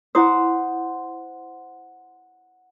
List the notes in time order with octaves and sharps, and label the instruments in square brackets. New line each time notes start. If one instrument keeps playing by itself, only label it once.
[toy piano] E4 D6 D#6 [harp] C5 F#5